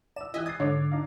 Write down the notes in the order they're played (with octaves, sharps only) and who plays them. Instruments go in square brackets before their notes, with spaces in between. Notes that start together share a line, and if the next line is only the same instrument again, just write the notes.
[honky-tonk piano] D5 E6 [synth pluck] E7
[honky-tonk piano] E3 G4 F#6 [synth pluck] D#5 E5 G#5
[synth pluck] D#6 [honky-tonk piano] G#6 A6 C7
[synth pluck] G#2 D3 [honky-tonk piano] C#5 D6
[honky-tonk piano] D4 D#4 F5